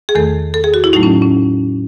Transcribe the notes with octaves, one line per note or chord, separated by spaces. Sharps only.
G#4
E2 D#3 A3 A4
A4
G#4
F#4
E4
A2 F#3 A3 D#4
C#4
C#4